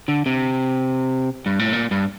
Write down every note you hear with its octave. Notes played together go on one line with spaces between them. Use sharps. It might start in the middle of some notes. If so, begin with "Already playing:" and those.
D3
C3
G2
A2
A#2
G2